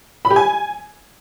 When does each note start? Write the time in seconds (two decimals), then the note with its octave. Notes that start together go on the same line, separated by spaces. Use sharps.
0.25 B5
0.30 G4
0.36 G#5